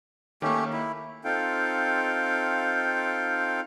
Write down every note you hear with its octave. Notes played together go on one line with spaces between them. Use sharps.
D#3 A3 A#3 C#4 G4
E4
C4 D#4 F4 A4 F5 G5